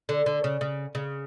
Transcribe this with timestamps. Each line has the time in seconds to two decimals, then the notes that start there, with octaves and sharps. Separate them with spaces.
0.09 D3
0.26 D3
0.44 C#3
0.61 C#3
0.95 C#3